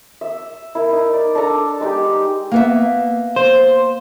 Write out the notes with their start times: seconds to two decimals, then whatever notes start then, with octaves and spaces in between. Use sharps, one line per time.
0.21 E5
0.75 E4 A#4
0.92 D#4
1.13 D5
1.35 D4 A4 D5 A#5
1.81 G#3 D#4 G4
2.52 A#3 B3 E5
3.36 C5